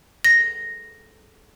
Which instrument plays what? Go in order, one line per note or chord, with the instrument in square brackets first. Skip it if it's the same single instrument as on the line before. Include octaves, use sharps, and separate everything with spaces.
[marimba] A#6